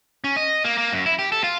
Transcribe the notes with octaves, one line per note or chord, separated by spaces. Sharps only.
C#4
D#5
A#3
A#3
F#2
E4
G4
A4
F4